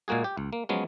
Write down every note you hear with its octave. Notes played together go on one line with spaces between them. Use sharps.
A#2 G#3 A#3 F#4 G#4
G4
C#2
A#3
F3 F#3 G#3 B3 C#4